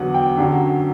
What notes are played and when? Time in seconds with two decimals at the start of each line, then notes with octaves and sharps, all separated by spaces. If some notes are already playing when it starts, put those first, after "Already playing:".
Already playing: E2 D3 F#3 F#5
0.14 G5
0.37 F#2 D3 F#3